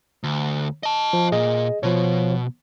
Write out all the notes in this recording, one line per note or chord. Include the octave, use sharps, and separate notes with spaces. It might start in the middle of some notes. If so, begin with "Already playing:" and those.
D2
D#5 A5
F3
A#2 G#4 D#5
B2 F3 C#5